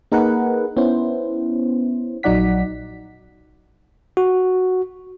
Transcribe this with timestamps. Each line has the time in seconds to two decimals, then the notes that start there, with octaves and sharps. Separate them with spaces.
0.12 A#3 D#4 G#4 A#4 B4 F#5
0.77 B3 C#4 E4 C5
2.23 A#1 F#3 D#4 D5 F#5 B6
4.17 F#4